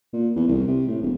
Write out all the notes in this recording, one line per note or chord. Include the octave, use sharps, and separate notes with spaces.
A#2
E2
C2
C3
A2
E1